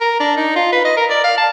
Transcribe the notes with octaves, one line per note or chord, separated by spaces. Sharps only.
A#4
D4
D#4
F4
B4
D#5
A#4
D5
F5
A5